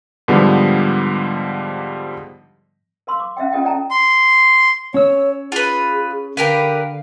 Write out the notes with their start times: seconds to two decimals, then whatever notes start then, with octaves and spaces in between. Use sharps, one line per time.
0.28 G#2 D3 F3 G3 B3
3.07 A#4 F5 C6 E6
3.20 D6
3.37 C#4 E5 F5 G5
3.52 C#4 F4 A4 D#5 G5
3.64 A4 D5 E5 G5 A5 A#5
3.91 C6
4.94 C#4 C#5 E6
5.52 F4 G#4 B4
6.37 D3 G4 A#4 B4 F5